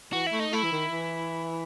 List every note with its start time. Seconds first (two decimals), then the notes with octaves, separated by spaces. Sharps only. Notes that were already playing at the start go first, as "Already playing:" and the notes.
0.13 E3 F#4
0.27 E4
0.32 A3
0.40 D#4
0.52 A3 E4
0.63 E3
0.72 D#3
0.91 E3